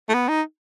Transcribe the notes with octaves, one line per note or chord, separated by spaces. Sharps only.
A3
B3
D#4